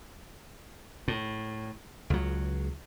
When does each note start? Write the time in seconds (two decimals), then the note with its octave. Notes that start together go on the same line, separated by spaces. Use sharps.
1.08 A2
2.10 C#2 F#3